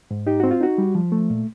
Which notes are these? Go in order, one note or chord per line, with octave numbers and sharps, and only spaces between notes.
G#2
D#4 G4
C4 F#4
F4
D#4 F#4
G3
F3
A3
A#2